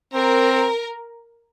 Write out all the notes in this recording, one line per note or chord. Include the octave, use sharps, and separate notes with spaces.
C4 A#4